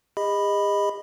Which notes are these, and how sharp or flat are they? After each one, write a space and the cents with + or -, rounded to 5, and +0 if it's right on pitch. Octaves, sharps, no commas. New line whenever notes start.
G#4 -45 D#5 +0 B5 +0